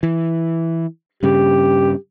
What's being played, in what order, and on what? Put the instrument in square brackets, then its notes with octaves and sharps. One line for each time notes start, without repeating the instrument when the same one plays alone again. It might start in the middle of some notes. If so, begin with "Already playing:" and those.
[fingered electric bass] E3
[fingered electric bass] G2 C#3 [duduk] G4